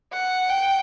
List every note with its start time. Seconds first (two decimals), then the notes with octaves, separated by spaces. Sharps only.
0.13 F#5
0.49 G5